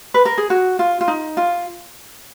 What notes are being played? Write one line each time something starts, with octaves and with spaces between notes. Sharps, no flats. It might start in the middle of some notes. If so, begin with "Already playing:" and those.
B4
A#4
G#4
F#4
F4
F4
D#4
F4